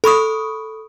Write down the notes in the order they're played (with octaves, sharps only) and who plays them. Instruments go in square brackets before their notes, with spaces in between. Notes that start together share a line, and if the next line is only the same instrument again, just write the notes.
[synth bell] A4 B5 C#6 D#6